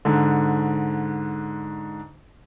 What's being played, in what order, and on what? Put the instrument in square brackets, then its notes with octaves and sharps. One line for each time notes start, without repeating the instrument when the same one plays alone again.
[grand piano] G#2 D3